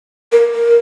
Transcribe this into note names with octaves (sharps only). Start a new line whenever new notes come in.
A#4
A#4